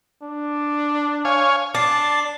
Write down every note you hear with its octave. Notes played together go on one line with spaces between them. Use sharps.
D4
C#5 F5 G#5
D4 A5 D6 C7